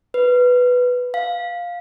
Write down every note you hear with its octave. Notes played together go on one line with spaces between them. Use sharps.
B4
F5